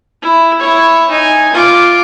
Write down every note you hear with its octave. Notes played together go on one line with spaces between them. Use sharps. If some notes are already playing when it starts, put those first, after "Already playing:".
E4
E4 C#5
D#4 G#5
F4 D6